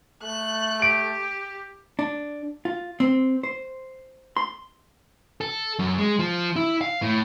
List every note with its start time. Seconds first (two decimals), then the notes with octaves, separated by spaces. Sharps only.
0.23 A3 F#6
0.82 G4 D7
1.99 D4
2.65 F4
3.00 C4
3.43 C5
4.37 C6
5.41 A4
5.79 F#2
5.98 G#3
6.19 F3
6.56 E4
6.81 F5
7.02 A2